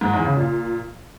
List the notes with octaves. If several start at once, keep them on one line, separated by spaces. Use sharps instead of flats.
G#2
E2
C#3
A#2